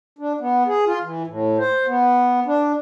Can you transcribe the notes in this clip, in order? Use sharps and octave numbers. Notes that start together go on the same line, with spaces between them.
D4
B3
G#4
F4
E3
A2
C5
B3
D4